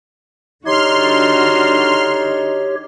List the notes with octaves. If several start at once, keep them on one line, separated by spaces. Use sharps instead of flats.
D3 D4 D#4 F#4 G4 C#5 C6 F6